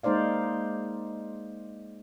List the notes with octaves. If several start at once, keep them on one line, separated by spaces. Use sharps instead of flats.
G#3 A#3 D#4 C5 D5 F5